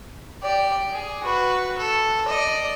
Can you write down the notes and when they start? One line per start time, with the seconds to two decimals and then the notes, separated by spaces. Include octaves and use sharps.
0.42 G4 D5
0.92 G#4
1.23 F#4 B4
1.78 A4
2.28 D5 D#5